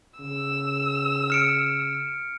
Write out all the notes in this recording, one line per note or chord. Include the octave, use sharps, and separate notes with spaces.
C#3 E6
F6 C#7 D7